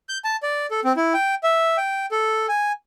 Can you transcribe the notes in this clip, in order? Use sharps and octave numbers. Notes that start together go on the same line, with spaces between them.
G6
A5
D5
A4
C4
E4
G5
E5
G5
A4
G#5